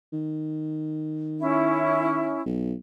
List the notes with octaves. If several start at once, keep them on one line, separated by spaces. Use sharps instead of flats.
D#3
C#4 E4
B1